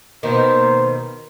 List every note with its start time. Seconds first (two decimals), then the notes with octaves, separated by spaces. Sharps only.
0.23 B2 D#3 A#3 C5